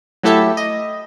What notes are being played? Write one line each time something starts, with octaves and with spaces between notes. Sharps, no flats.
F#3 A3 E4 G4 A4 E5
D#5